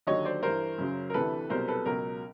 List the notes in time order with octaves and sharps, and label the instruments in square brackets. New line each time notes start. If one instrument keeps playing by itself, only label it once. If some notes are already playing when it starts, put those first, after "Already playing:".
[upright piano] D#2 D3 F#3 C#5 D#5
C5 D5
G2 E3 A#4 C5
F#2 C#3 F#3
A#4
D2 C3 E3 A4 B4
C2 B2 F#3 A#4 C5
A4 B4
C#2 B2 F#3 A#4